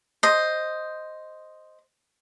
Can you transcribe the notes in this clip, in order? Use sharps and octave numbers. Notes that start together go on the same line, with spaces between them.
C5 D#5